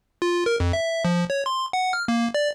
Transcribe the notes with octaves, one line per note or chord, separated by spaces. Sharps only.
F4
A#4
F2
E5
F3
C#5
C6
F#5
F6
A#3
D5